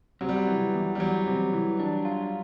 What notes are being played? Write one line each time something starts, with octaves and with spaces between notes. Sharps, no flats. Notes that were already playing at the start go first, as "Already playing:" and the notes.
C3 F#3
G3
F#3
E3
E2
G3
E2 F#3
C3
E3
D4
F4